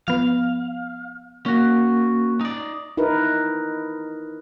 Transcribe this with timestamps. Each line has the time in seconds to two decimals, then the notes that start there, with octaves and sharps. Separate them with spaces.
0.08 F3 B3 F5
1.46 A#3 C#4 F#4
2.41 D#4 D5
2.97 D#4 E4 A#4 B4